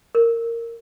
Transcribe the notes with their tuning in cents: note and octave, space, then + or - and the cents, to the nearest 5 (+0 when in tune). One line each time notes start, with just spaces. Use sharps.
A#4 -10